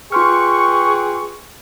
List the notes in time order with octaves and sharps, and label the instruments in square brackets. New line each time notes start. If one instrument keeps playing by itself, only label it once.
[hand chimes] F4 C6 F6 [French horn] G#4 [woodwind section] B4 G5 C#6